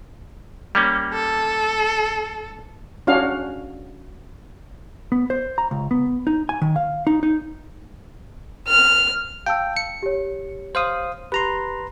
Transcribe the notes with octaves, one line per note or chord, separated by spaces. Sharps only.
G3 A#3 C#4
A4
C#4 D4 F#4 F5
B3
C5
A#5
C#2
B3
D#4
G#5
D#3
F5
D#4
D#4
F6
F5 G5 A5 E6
C#7
G4 C#5
C5 F5 D#6
G4 B4 A#5 C6 F7